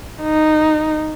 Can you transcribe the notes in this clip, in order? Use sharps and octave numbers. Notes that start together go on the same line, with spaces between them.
D#4